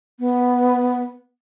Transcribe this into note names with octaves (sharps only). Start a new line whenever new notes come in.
B3